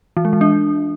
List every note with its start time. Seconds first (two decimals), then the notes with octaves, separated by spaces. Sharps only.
0.17 E3
0.25 G#3
0.33 E3
0.41 D4